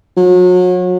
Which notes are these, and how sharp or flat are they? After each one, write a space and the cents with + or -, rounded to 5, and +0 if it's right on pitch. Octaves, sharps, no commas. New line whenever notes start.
F#3 -35